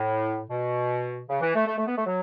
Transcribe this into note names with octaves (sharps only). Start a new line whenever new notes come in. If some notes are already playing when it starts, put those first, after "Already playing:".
Already playing: A2
B2
C#3
E3
A3
A3
A3
B3
A3
F#3